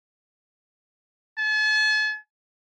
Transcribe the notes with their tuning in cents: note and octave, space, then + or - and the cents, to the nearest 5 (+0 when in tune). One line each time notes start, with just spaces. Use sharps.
A5 -45